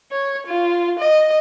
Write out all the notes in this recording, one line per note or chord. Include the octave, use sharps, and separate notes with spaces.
C#5
F4
D#5